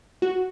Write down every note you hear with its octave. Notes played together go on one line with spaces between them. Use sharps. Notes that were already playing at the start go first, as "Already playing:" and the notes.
F#4